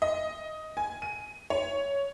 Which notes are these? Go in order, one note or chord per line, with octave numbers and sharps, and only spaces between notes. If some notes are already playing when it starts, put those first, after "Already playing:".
D#5
G#5
D#7
C#5